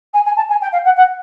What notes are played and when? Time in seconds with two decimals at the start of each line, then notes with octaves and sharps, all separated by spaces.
0.13 G#5
0.25 G#5
0.36 A5
0.49 G#5
0.61 G5
0.72 F5
0.84 F#5
0.96 F#5